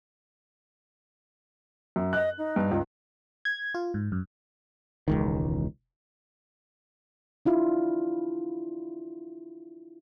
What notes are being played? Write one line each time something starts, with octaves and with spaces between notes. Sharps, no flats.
F#2
D#5 F#6
D#4
G2
C#2
G#6
F4
G#2
F#2
E1 C#2 D#3
D4 E4 F4